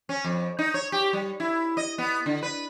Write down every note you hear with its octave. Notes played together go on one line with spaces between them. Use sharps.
C#4
F2
D#4
C#5
G4
G3
E4
D#5
B3
D3
B4